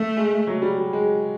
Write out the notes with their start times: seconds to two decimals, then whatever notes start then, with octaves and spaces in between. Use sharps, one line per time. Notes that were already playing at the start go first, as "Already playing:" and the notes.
Already playing: A3
0.17 G#3
0.47 F#3
0.62 G3
0.77 G3
0.93 G#3